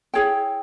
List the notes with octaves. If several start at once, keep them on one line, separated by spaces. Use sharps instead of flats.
E4 G#4 C#5 G5